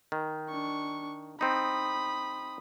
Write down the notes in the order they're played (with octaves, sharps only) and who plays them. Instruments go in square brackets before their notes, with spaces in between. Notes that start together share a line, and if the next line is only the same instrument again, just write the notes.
[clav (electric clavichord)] D#3
[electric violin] D4 C#6
[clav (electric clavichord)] C4 D#4 [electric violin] B5 D#6